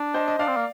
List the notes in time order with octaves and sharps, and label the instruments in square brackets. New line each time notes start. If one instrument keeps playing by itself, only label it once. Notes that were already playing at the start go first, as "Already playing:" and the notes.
Already playing: [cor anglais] D4
[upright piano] C5 D#5
D#5
[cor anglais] D4 [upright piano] D5 F5
[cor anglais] C4
A#3